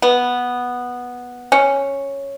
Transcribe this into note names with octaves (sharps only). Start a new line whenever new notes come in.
B3
C#4